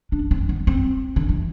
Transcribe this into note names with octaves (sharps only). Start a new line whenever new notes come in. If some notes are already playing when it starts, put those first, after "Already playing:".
D4
C4
B3
C4
D3
E3